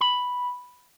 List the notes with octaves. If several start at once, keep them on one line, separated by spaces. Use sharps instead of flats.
B5